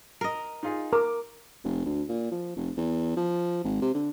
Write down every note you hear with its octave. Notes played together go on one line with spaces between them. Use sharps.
A#4 D#5
D#4 F4 G#4
A#4 D6
F1
D2
A#2
F3
F1
E2
F3
G#1
C3
D3